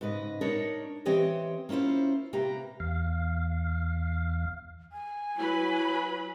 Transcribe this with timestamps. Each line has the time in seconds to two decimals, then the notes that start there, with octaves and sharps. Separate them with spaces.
0.01 G#2 C#3 B4 D#5
0.41 D4 D#4 A#4 C#5
1.05 E3 C4 G4 C#5 D#5
1.69 A#3 C#4 E4 F4 C5
2.33 C3 A#3 G4 B4 A#5
2.80 E2 F5
4.92 G#5
5.37 F#3 E4 B4 B5